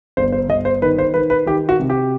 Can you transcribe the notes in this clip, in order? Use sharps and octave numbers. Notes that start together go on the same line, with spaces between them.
G1 C5
C5
G1 D#5
C5
D#3 B4
C5
D#3 B4
B4
D#3 G4
F#4
C3
G4